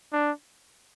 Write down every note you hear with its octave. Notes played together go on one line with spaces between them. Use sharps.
D4